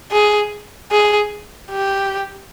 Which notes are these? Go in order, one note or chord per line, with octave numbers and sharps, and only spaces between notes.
G#4
G#4
G4